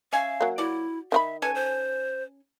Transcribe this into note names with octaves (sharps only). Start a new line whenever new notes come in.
C#4 E5 F5 G#5
F#3 A#3
E4 F#4 D5
D#3 F4 E5 B5
C#4 A4 B4 G#5
C5